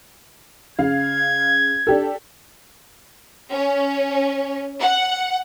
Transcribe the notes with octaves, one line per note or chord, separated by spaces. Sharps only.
C#3 F5 G#6
D4 G4 A4
C#4
F#5